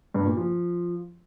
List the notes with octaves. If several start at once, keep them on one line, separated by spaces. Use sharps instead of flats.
G2
A#2
F3